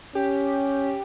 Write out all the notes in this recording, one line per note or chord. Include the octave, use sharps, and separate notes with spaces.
C#4 G4